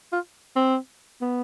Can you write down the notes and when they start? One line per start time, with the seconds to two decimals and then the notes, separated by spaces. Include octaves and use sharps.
0.12 F4
0.56 C4
1.21 B3